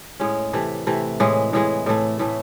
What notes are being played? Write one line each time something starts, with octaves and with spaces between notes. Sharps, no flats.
A2 G#3 C#4
C3 E3 A3
C3 E3 A3
A2 E3 G#3
A2 E3 G#3
A2 E3 A3
A2 E3 A3